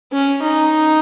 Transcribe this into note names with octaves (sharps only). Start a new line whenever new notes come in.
C#4
D#4